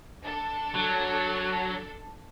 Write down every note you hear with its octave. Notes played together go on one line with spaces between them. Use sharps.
D4 A4
F#3